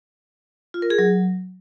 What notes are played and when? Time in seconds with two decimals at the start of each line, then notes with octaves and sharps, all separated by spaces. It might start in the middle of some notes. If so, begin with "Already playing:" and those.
0.74 F4
0.82 A#4
0.90 G#4
0.99 F#3